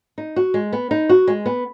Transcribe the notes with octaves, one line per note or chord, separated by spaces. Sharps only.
D#4
F#4
G#3
B3
D#4
F#4
G#3
B3